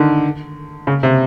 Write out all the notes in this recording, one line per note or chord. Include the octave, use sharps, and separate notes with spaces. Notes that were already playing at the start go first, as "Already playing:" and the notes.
Already playing: D3 D#3
C#3
C3